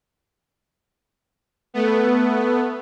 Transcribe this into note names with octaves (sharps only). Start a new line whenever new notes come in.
A3 B3